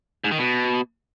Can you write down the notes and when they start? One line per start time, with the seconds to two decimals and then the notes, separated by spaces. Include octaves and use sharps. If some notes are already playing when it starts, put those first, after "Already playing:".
0.24 G#2
0.31 D#3
0.38 B2